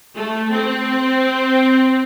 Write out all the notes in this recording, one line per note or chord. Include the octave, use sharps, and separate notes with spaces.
A3
C4